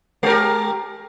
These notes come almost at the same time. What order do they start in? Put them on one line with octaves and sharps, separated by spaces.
G#3 A#4 G4